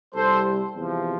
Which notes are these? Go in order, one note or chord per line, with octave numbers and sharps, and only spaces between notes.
C2 C3 G3 A4 C5
E2 C3 F3